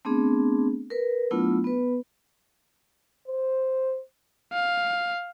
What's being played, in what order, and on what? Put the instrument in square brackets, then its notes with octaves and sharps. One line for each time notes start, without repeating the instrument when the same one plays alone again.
[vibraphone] A3 B3 C4 D4 G#4
A#4 B4
F#3 A3 B3 D4 E4 F4
B3 B4
[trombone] C5
[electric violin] F5